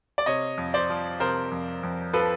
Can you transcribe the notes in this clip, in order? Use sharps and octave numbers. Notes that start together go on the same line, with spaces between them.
D5
C3 C#5 D#5
F2
C5 D5
F3
C3 A#4 C5
F2
F2
F3 A4 B4